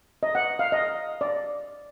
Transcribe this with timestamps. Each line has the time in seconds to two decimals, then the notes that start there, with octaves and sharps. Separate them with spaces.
0.23 D#5
0.35 F#5
0.59 F5
0.72 D#5
1.21 D5